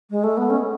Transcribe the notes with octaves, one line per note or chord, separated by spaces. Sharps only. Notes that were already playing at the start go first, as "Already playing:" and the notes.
G#3
A3
B3
C#4